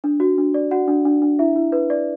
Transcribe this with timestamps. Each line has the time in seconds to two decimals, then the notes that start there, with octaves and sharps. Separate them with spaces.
0.04 D4
0.20 F#4
0.38 D4
0.54 D5
0.71 F#4 F#5
0.88 D4
1.05 D4
1.22 D4
1.39 E4 E5
1.56 E4
1.72 B4
1.90 D5